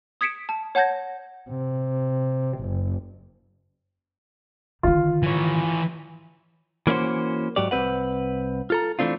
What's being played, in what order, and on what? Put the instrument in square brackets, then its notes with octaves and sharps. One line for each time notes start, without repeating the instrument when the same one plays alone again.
[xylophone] D#6 G#6 B6 C#7 D7 E7
A5
C#5 F#5 A5 G6 G#6 A#6
[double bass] C3
F#1
[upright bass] D3 D#3 [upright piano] F4
[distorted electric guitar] E3 C#5
[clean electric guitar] E3 A#3 C#4 E4 F#4 C5
G#2 F#3 G4 D5
C2 G2 C4 B4 F#5
F4 A4 A#5
E3 F3 A3 C4 D4 F4